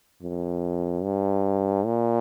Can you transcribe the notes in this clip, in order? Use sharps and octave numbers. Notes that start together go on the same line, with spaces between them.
F2
G2
A#2